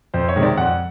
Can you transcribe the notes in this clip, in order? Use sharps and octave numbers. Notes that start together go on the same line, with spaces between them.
F2 C5
C#5
C3 D#3 G#3
D5
F2 F#5